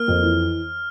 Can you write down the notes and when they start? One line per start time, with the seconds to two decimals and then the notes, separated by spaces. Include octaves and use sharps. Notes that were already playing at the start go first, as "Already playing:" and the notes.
Already playing: A#3 F6
0.08 F2
0.23 E3